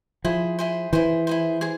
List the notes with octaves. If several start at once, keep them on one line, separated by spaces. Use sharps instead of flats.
F3 E4 G#4 C5
E4 G#4 C5
E3 E4 G#4 C5
E4 G#4 C5
G#4 C5